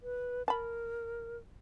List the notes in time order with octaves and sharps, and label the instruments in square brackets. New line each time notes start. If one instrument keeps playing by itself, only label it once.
[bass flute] B4
[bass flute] A#4 [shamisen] A5 B5